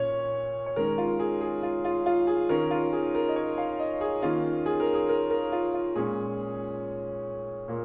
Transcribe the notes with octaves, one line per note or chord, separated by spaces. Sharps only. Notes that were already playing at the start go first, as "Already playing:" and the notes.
Already playing: A#2 C#4 C#5
C#5
D#3 G#3 C#4 A#4
F4
G#4
G#4
F4
F4
F4
G#4
D#3 C#4 A#4
F4
G#4
A#4
D#5
C#5
F5
D#5
G#4
D#3 A#3 C#4 F4
G#4
A#4
G#4
A#4
A#4
F4
F4
A#2 G#3 C#4 G#4
A#2 A#3